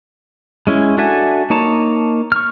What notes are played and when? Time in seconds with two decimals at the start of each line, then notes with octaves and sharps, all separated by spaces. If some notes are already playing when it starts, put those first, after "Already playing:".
0.67 G#3 C#4 E4
0.98 D4 F#4 A4 E5 G#5
1.50 A#3 D#4 C#5 A5
2.32 C#6 F6